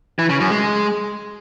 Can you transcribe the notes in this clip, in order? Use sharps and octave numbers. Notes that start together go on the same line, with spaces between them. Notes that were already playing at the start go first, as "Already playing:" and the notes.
E3
C#3
F#2
G#3